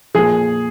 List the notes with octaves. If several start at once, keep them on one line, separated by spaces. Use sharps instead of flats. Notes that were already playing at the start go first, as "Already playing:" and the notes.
A#2 F3 G#4